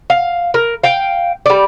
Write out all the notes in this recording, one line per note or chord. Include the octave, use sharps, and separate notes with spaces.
F5
A#4
F5 G5
G3 D5